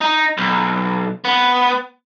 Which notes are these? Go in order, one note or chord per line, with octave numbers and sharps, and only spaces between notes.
D#4
B1
B3